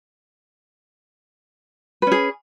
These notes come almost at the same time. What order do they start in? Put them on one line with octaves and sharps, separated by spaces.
B4 C#4 G#4